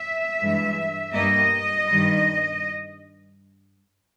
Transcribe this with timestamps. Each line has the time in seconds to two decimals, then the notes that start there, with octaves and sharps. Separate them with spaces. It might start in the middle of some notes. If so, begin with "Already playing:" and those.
Already playing: E5
0.42 G2 E3 G#3
1.15 G2 G3 A#3 D#5
1.88 G2 D#3 G3